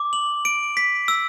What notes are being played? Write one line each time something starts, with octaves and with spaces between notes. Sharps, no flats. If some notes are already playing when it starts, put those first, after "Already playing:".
Already playing: D6
F#7
D7
B6
E6